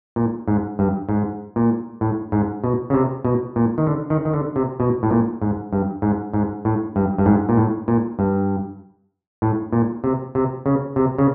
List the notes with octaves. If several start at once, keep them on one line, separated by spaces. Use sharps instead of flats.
A#2
G#2
G2
G#2
A#2
A2
G#2
B2
C#3
C3
B2
A#2
D#3
D3
D#3
D#3
D3
C3
B2
A2
A#2
G#2
G2
G#2
G#2
A2
G2
G2
G#2
A#2
A2
A#2
G2
A2
A#2
C3
C3
C#3
C3
C#3